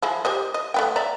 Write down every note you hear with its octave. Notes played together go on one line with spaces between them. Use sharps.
F3 G#3 E4
G4 C5 D#5
D#5
A3 B3 G5
D5 E5 A#5